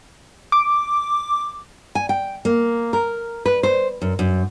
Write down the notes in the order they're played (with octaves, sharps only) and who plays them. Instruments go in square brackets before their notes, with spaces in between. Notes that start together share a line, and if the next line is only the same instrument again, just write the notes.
[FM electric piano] D6
[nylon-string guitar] G#5
G5
A#3
A#4
B4
C5
F#2
F#2